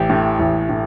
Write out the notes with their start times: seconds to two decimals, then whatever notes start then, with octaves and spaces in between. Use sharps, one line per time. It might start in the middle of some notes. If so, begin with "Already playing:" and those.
Already playing: A1 G4
0.10 A2
0.39 A1
0.69 A2